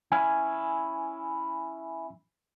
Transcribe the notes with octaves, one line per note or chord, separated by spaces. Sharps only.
C#4 E4 G#5